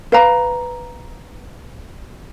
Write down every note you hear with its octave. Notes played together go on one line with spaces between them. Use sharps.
B4 F5 A#5